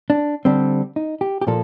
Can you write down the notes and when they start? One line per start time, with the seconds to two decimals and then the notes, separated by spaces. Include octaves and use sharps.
0.10 D4
0.45 D3 G3 C4
0.96 D#4
1.21 G4
1.41 G4
1.47 A#2 F3 A#3 A4